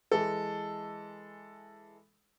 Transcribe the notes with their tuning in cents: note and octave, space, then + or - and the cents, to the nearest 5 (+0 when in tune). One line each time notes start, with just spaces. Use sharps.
E3 +0 G#3 -5 A4 +0